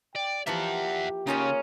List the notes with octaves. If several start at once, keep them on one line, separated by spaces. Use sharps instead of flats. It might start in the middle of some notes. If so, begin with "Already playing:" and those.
D5 G5
E3 F3 A#3 G4 E5 F#5
C#3 A#3 C#4 D#4 F4 G#4